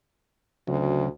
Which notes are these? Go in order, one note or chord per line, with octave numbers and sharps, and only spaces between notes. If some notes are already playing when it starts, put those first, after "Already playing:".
D2 C#3 F#3